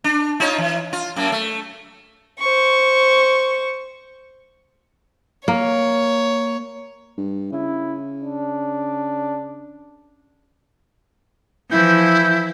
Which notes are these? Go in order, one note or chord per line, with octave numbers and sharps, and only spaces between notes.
D4
D#4 F4 C#5
E3
F4
F#2 A#3
A3
C5 C#6
A#3 C#5
G2
C#3 E4
D4
E3 F3 E4 G6